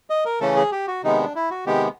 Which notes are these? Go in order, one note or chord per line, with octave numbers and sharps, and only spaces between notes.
D#5
A#4
C#3 E3 A3 C#4 A4
G#4
G4
F#4
C3 D#3 G#3 B3 D#4
D4
E4
F#4
C3 D#3 G#3 B3 G4